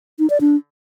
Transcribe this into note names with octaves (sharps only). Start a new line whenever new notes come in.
D#4
D5
D4